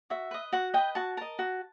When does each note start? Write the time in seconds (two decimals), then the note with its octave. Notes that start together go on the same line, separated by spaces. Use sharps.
0.10 F#4 E5
0.31 B4 D#5
0.52 F#4 F#5
0.74 B4 D#5 G5
0.95 F#4 A5
1.17 A#4 D#5 A5
1.39 F#4